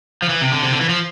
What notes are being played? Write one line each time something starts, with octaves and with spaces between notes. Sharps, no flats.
F3
E3
C3
D3
C3
D3
E3
F3